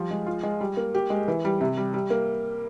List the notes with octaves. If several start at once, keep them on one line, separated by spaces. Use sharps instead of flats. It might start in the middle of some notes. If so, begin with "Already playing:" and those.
Already playing: F3 G3
G#3
F4
G#3
G3
A#3
G4
G#3
E3
G3
C3
G3
G3
A#3